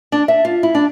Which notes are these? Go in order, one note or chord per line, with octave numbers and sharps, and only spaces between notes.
D4
E5
F4
E4
D4